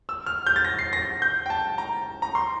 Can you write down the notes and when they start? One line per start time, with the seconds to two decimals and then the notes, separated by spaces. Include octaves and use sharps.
0.09 E6
0.26 F6
0.47 G6
0.56 A6
0.65 A#6
0.79 C7
0.93 A#6
1.22 G6
1.46 G5
1.50 A5
1.78 A#5
2.22 A#5
2.35 C6